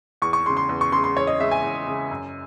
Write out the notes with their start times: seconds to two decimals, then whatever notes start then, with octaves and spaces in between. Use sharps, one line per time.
0.22 E2 C#6
0.33 C#6
0.46 G#3 C6
0.50 C#3
0.57 C6
0.69 E2
0.81 C#6
0.92 C#3 C6
0.97 G#3
1.04 C6
1.17 E2 C#5
1.27 D#5
1.40 C#3 G#3 E5
1.51 G#5
1.63 E2
1.87 C#3 G#3
2.11 F#2